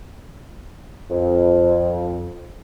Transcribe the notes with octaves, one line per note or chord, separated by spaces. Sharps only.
F2